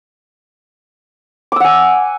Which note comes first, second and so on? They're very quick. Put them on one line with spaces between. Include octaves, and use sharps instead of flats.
D6 E6 F#5 G#5